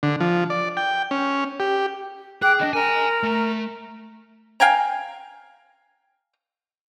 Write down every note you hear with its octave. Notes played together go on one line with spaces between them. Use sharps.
D3
F3
D5
G5
C#4
G4
G#4 G5 D6 F#6
D3 D4 D#5
A#4 D#5 G#5 A#5
A3
F5 G5 G#5 A#5